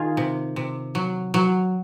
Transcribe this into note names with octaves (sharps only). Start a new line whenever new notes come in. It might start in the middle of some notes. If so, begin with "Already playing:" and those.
Already playing: D#3 F4 G#4
C3
C3
F#3
F#3